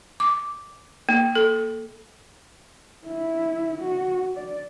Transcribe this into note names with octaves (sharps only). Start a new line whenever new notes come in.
D6
A#3
A4
E4
F#4
D5